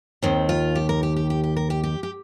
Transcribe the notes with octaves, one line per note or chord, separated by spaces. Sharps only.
D#2 D#3 C4
F4
G4
A#4
G4
G4
G4
G4
A#4
G4
G4
G4